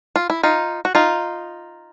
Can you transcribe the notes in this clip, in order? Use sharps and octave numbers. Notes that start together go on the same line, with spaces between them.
F4
E4
D#4 F4
F#4
D#4 F4